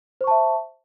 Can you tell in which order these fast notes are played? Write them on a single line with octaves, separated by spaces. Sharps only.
C5 C#6 A5 E5